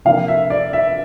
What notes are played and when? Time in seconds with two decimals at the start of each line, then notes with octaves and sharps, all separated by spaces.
0.05 C3 F3 A#3 D4 F5
0.28 E5
0.50 D5
0.73 E5